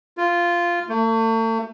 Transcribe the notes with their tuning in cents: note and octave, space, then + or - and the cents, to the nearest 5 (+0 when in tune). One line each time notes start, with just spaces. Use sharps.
F4 -10
A3 +40